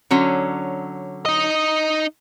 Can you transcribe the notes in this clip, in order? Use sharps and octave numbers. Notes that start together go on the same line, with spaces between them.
D3 F#3 C#4
D#4 D#5